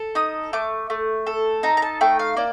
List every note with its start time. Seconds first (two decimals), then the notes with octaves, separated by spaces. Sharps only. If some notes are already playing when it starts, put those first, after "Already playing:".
Already playing: A4
0.15 D#4 D#6
0.53 A3 D6
0.90 A3
1.27 A4
1.63 D#4 A#5
1.77 A#5
1.82 A5
2.01 A3 G5
2.19 F5
2.37 A#3 D5